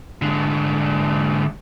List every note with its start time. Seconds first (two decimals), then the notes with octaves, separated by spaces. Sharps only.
0.22 G#2 D3